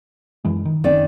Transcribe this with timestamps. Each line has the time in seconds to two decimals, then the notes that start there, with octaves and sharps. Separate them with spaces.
0.45 F#2 E3 G#3
0.65 D#3
0.84 F#1 D#3 C4 C#4 D5